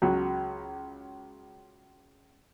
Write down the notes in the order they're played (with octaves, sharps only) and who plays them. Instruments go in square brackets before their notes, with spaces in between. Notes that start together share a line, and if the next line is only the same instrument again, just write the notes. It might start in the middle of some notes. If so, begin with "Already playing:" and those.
[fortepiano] C#2 F#3